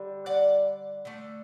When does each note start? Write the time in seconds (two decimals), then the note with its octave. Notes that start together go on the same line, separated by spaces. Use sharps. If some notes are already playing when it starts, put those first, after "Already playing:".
Already playing: D3 G3
0.26 D5 F#5
1.05 D3 A3